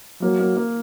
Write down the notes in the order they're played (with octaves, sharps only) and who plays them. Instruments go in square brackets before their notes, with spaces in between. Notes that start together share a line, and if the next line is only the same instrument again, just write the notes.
[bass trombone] F#3 [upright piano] A#3
[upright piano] A#3
A#3